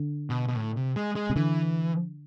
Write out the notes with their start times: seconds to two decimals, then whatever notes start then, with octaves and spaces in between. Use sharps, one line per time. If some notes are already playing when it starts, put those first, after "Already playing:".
Already playing: D3
0.30 B2
0.48 B2
0.56 A2
0.77 C3
0.96 G#3
1.16 G#3
1.30 C3
1.36 D3 E3